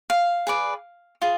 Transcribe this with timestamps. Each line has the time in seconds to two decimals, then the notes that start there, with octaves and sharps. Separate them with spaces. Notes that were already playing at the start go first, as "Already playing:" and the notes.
0.10 F5
0.47 G#4 B4 D5
1.22 F4 G#4